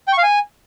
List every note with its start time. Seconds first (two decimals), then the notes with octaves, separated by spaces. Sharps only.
0.08 G5
0.13 C#6
0.18 F5
0.23 G#5